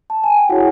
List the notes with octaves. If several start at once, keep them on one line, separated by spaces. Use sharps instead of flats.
A5
G#5
G5
E4 F#4 G#4 C#5 F#5